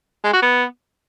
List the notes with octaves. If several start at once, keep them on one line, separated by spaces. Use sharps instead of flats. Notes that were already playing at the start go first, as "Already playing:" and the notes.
G#3
F#4
B3